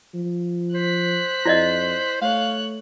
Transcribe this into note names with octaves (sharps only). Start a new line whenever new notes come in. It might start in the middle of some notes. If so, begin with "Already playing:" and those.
F3
C5 F#6 B6
F2 E4 D5 D#5
A3 C#5 F5 F#6